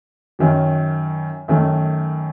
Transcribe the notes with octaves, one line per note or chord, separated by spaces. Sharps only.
F#2 D#3 F#3
F#2 D#3 A3